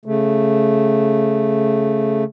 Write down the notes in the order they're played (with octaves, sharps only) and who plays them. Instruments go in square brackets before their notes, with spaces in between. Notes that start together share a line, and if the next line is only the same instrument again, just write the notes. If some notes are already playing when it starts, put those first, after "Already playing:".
[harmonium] C#3 A3